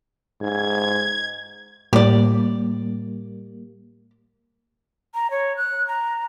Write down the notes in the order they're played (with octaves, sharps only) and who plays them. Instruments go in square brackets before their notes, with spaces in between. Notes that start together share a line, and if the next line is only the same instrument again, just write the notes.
[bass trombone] G#2 [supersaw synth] G#6
[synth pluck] A2 [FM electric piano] G3 A#3 [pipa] G4 D5
[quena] A#5
C#5
F#6
A#5